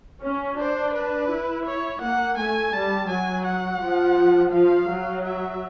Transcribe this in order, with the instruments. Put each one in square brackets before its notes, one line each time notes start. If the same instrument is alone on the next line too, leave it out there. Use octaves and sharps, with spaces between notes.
[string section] C#4
[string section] D4 [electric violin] C5
[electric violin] B4
[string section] E4
[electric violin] C#5
[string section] A#3 [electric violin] F#5
[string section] A3 [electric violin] G#5
[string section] G3 [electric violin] A5
[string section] F#3 [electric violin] G#5
[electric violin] F#5
[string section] F3
[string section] F3 [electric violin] F5
[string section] F#3
[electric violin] E5